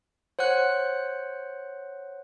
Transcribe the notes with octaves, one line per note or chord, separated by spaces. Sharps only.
C5 C#5 F#5 F#6